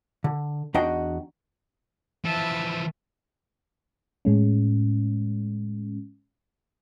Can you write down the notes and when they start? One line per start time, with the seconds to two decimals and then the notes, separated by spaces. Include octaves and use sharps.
0.24 D3
0.74 E2 D4 D#4 F#4 D#5 G5
2.25 E3 F3 E5 A5
4.25 A2 G#3 C#4